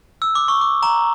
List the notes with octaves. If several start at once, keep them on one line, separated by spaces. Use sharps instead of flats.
E6
D6
C#6
D6
A#5